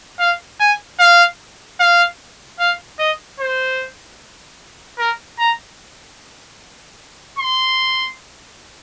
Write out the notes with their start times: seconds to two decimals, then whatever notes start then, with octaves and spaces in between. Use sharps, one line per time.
0.19 F5
0.60 G#5
1.00 F5
1.80 F5
2.59 F5
2.99 D#5
3.40 C5
4.99 A#4
5.39 A#5
7.39 C6